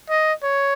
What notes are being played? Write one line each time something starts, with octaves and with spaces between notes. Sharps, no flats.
D#5
C#5